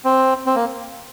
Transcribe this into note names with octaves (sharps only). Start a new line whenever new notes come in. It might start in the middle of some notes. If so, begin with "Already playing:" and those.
C4
C4
A#3